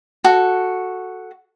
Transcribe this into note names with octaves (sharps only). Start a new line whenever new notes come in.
F#4 A4